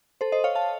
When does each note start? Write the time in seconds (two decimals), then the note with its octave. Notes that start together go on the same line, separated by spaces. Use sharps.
0.21 A4 C5
0.32 C5 D#5
0.44 C#5 F5
0.55 F5 A5